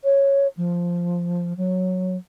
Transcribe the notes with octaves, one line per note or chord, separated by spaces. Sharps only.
C#5
F3
F#3